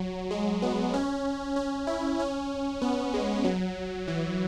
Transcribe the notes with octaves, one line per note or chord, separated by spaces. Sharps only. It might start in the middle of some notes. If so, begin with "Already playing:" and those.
Already playing: F#3
G#3
B3
C#4
C#4
E4
C#4
B3
G#3
F#3
E3